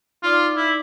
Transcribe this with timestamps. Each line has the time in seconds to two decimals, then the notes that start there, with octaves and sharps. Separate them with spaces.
0.23 D#4 F4 D5 D6
0.57 E4